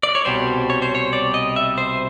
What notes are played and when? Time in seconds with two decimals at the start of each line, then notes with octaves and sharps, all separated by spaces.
0.03 D5
0.15 C#5
0.25 C2 B2 G3 C5
0.70 C#5
0.82 C5
0.95 C#5
1.13 D5
1.34 D#5
1.56 E5
1.78 C5